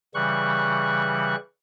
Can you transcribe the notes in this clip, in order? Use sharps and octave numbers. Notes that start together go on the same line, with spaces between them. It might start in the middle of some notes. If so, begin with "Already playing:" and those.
C#3 E3 G3 C#6 F#6